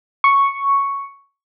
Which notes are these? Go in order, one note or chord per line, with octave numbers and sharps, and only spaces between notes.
C#6